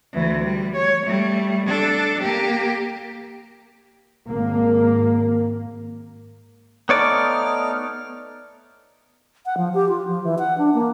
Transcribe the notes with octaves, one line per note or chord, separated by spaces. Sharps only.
D2 E3
G3
C#5
G3 A3
D4 A4
A#3 G4
G#1 A#3
A3 B3 D#4 C#5 D5 F6
F#5
F3
G4
F4
F3
E3
F#5
D4
A#3